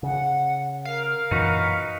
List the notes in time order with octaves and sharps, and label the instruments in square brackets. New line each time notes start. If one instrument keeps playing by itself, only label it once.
[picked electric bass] C#3 [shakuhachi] F#5
[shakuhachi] A#4 [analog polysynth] F5
[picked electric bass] F#2 A#2 E3 [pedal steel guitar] D#4 F#4 B4